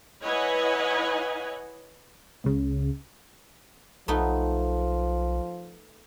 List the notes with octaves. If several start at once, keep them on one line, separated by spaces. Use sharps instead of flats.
E4 B4 C#5 D#5 F#5 G#5
C#2 C#3
B1 F3 A3 B3 D#4